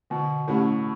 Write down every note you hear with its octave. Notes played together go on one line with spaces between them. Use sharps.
B2 D3
A2 A3 C#4 G4